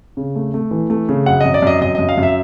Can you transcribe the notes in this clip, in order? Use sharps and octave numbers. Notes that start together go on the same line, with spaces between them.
C#3
A3
A3
E3
A3
C#3
F#2 F#5
F#2 D#5
D5
F#2 D#5
F#2 D#5
F#2 D#5
F5
F#2
E5